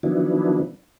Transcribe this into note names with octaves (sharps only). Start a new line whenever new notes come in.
D#3 F3 F#3 B3 D4 E4